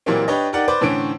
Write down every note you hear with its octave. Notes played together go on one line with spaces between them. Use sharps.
A#2 E3 F#3 G3 A#3 C4
D4 G4 B4 C#5 D#5
D#4 G4 A#4 D5 F#5
B4 C5 D5 D6
A2 D3 E3 C#4 C5 D7